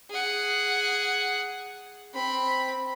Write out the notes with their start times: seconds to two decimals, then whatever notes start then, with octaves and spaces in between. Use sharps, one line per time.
0.11 G#4 F#5
2.14 C4 B5